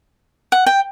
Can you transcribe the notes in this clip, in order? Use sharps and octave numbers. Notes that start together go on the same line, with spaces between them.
F#5
G5